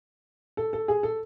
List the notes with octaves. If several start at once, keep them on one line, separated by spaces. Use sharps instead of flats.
A4
A4
G#4
A4